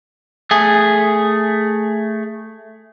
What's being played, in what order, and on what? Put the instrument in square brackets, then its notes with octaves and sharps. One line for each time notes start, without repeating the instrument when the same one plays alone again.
[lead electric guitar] A3 G#4